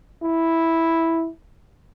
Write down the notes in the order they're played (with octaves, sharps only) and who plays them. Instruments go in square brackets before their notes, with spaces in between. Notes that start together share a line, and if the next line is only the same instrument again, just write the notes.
[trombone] E4